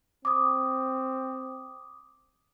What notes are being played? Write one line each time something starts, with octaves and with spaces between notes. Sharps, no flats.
C4 D6 D#6